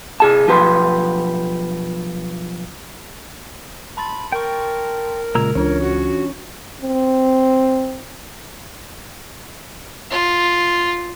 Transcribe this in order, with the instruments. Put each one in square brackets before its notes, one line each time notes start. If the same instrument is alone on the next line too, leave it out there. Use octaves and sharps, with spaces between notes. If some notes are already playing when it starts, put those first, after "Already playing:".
[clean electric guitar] C3 G#4 A5
B1 F3 G4 B4 C6
[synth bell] A5 C6 A6 [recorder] B5
[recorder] A#4 [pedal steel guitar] G5 C#6
[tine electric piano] A#2 C#3 G#3 [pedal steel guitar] A#3 A#5 E6 [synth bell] G#6
[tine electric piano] C#2 [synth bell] E3 D4 F4 [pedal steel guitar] C#4 C#5
[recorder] F#4
[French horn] C4
[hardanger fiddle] F4